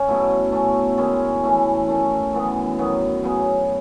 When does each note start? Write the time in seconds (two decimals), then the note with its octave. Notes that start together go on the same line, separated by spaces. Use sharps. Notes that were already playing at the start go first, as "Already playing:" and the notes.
Already playing: C#4
0.08 B2 F#3 A3 E4
0.52 B2 A3 C#4
0.98 D#3 G#3 C#4 E4
1.43 E3 A3 C#4 E4
1.88 D#3 A3 C#4
2.33 F#2 E3 B3
2.78 D#3 F#3 B3
3.23 C#3 F#3 B3